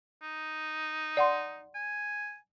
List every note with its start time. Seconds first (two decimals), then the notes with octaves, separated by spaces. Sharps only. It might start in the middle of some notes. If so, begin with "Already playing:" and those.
0.22 D#4
1.17 D5 F#5 C6
1.75 G#5